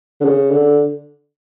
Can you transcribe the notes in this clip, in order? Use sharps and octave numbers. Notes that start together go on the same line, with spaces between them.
D3
C#3
D3